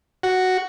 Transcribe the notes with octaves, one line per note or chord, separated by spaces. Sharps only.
F#4